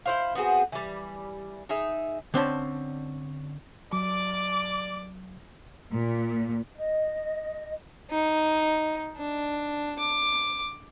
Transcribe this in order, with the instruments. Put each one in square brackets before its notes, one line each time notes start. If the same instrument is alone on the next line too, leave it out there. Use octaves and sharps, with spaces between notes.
[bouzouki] E4 C5 F5
B3 C4 F#4 G#4
E3 G3
D#4 G#4 E5
[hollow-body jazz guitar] D3 C4 C#4 A5
[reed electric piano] F#3 [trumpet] D5 [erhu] D6
[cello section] A#2
[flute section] D#5
[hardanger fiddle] D#4
D4
D6